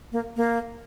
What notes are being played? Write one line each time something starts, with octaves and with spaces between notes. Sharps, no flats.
A#3
A#3